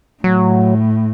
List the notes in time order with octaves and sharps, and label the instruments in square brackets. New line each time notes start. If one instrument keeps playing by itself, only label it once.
[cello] A2 [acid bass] F#3